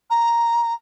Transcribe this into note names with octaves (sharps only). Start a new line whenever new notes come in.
A#5